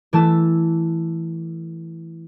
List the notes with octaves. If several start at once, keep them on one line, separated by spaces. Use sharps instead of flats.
E3 A3 A5 E6